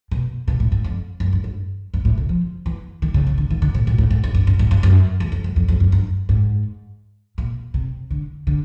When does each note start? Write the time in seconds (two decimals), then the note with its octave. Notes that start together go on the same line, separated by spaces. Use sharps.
0.11 B2
0.48 B2
0.60 A2
0.72 G#2
0.84 F2
1.20 F#2
1.33 G2
1.44 G2
1.94 G2
2.05 A2
2.18 C3
2.29 F3
2.66 E3
3.02 D#3
3.14 C#3
3.27 C#3
3.38 D3
3.51 D#3
3.62 D3
3.75 A#2
3.87 A#2
3.98 A2
4.11 G#2
4.24 G2
4.35 G2
4.47 G2
4.59 G#2
4.71 G2
4.83 F#2
5.20 E2
5.32 F2
5.44 F#2
5.56 F2
5.68 F2
5.80 F#2
5.92 G2
6.29 G#2
7.38 A#2
7.74 C3
8.11 D3
8.47 D3